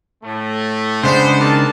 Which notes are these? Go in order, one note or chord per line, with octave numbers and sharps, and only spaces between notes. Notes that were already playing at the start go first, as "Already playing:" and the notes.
A2 A3
C#3 G#3 B3 D4 G#4 C5
D#3 D5 A5